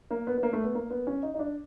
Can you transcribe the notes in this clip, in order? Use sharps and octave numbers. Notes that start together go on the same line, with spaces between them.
A#3
B3
B3
A#3
A3
B3
A#3
B3
C#4
D#4
D#4
D4